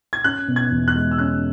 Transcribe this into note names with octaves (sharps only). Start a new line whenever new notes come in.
G#6
C#4 F#6
B2
G#6
E2
F#6
G#3
E6
C#4 F#6